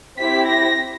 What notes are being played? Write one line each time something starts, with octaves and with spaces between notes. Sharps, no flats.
C4 E4 G4 B6
A#6